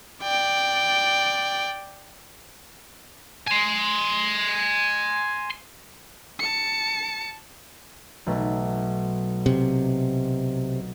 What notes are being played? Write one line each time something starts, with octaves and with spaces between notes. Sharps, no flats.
D5 G5
G#5 C6
A5 C#7
B1 A3
C3